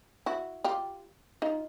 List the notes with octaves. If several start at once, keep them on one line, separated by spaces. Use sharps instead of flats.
E4 F#4
F4 G4
D#4 F4